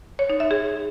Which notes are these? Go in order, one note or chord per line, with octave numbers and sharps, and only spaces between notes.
C#5
D#4
E5
G#4